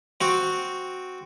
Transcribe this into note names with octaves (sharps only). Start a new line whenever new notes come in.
C4 F#4